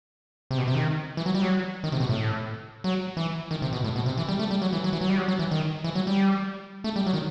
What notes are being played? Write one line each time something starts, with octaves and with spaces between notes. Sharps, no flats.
C3
B2
C3
D#3
E3
F#3
G3
F#3
D#3
C3
B2
A2
F#3
E3
D#3
C3
B2
A2
B2
C3
E3
G3
A3
G3
F#3
E3
F#3
E3
F#3
G3
F#3
F#3
E3
D#3
E3
F#3
G3
A3
G3
F#3
D#3